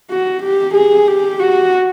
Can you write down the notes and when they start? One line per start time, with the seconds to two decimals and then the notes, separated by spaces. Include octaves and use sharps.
0.11 F#4
0.43 G4
0.75 G#4
1.08 G4
1.40 F#4